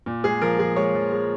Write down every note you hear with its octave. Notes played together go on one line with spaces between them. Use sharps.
A#2
G#3 G#4
F3 A#4
F3 G#4
G#3 C#5
F3
G#3